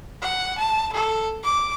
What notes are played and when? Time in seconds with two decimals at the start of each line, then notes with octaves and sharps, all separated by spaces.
0.22 F#5
0.58 A5
0.93 A4
1.43 D6